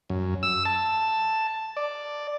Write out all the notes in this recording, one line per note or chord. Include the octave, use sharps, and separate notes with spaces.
F#2
E6
A5
D5